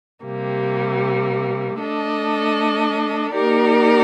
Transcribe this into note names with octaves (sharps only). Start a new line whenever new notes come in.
C3 G3 A#3
A3 D4 A4 D#5
A#3 D#4 G4 A#4 D5